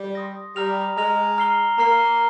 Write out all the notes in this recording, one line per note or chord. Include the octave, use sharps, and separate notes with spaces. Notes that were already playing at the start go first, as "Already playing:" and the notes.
Already playing: G3
C6 D#6 A#6
G3 A#5 F6 A#6 F7
G#3 A#5 F6 A#6 F7
A#5 F6 C7 G7
A#3 A#5 F6 C7 G7